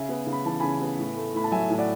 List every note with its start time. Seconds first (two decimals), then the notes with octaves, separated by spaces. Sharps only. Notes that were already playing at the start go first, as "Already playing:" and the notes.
Already playing: C#3 E5 G#5
0.09 B3
0.27 C#3
0.32 B5
0.45 E3 A5
0.60 C#3 G#5 B5
0.81 B3
0.99 A2
1.16 A3
1.34 A2 B5
1.44 A5
1.52 F#3 E5 G#5
1.70 A2 G#5
1.78 D5 F#5